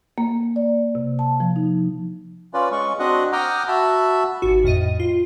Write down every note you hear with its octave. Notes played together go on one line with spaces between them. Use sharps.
A#3
D5
C3
A5
F3
D#4
C#4 F4 B4 D5
G#3 C#4 C#6
C4 D4 F#4 D#5 F#5
F#5 G5 A#5 D6 D#6 F6
F#4 E5 A5 B5
G#1 F#4
F2 A2 D#5 D#7
F4